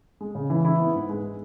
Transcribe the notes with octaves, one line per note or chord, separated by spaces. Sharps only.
G#3
C#3
E3
E4
B3
G#2
G#3